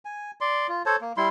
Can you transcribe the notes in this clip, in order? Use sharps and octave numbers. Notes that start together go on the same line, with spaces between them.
G#5
D5 C6
F4
A4 C5 C#5 A5
A#3
G3 E4 C6